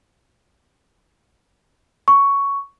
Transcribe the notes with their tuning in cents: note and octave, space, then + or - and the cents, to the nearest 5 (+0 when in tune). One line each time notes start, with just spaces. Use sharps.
C#6 +10